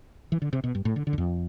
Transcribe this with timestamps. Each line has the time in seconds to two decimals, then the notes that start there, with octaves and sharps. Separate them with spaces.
0.32 E3
0.42 D3
0.53 C3
0.64 B2
0.75 G2
0.85 A2
0.96 D3
1.07 D3
1.13 E2
1.18 F2